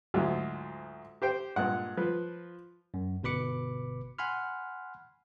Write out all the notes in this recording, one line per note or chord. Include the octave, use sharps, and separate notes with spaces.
D2 G#2 F#3 F4
G4 C5 G5
G2 A#2 G#3 F#5
F3 B4
F#2
G1 B2 B4 B5 D6 C#7
F#5 G#5 B5 C6 F6